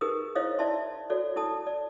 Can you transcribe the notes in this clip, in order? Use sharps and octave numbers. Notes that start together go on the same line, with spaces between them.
D#4 G4 G#4 A#4 B4 D#6
E4 C5 C#5 D#5 F5 D#6
E4 D5 E5 A5 C6
F#4 A4 C#5 D5
E4 A4 A5 D#6
D5